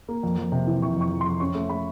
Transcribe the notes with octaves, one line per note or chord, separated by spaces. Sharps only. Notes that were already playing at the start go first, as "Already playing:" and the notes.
A#3
F2
F2
C3
E3
C3 C#6
F2 C#6
F2
C6
F2
C#4 C#6
A3
A3 B5